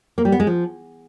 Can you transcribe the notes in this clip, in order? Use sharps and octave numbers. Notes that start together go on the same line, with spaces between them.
A#3
G3
B3
G#3
F3